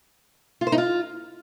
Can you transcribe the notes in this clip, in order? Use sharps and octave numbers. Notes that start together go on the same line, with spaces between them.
F4
C5
D#4
F4